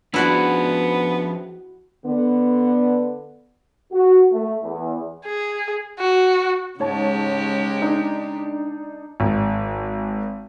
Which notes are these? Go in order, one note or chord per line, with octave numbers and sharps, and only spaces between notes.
F3 B3 C#4 D4 E4 F#4 G#4 D5
D3 B3
F#4
A3
E2
G#4
F#4
G#2 C#3 G#3 G4 C#5 A5
D4 D#4
G#1